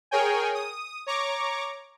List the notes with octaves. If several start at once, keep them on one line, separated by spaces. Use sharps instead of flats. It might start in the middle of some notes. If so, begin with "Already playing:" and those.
G#4 A#4 C#5 G5 G#5
D#6
C#5 A#5 C#6 D6